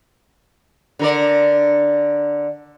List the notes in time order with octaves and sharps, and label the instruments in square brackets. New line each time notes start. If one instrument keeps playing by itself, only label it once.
[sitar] D3 A#4 D5